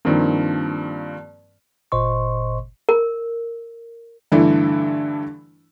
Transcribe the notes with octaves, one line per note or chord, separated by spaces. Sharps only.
G2 D#3 F3 A#3 C4
G1 A#2 C5 D#5 C6 C#6
A#4
G2 D3 E3 A3 D4 E4